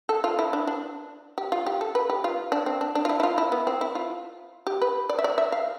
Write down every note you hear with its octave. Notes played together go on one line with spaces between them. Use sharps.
A4
F4
E4
D4
D4
G4
F4
G4
A4
B4
G4
F4
D4
C4
D4
D4
F4
E4
E4
F4
E4
B3
C4
E4
F4
G4
B4
D5
E5
D5
E5
F5